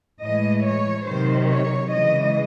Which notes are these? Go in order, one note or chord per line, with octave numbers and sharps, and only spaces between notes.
A2 E3 G#3 D#5
C#5
C3 D#3 F#3 C5
C#5
C#3 E3 G#3 D#5